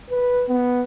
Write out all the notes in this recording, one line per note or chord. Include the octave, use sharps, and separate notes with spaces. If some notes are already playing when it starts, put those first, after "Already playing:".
B4
B3